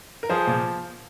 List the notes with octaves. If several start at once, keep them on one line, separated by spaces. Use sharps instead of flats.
A#4
F3 G#4 C5
A#2